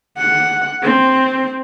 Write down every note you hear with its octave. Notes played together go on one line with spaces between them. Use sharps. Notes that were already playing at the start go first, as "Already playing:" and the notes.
F#5
C4